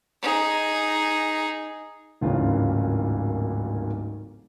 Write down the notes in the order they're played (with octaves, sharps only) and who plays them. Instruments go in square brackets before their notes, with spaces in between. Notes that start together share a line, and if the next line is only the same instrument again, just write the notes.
[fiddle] D#4 G#4
[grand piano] D1 G#1 D#2 C#3 E3 F4